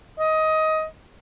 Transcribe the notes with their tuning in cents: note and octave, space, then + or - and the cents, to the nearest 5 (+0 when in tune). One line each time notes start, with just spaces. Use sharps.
D#5 +15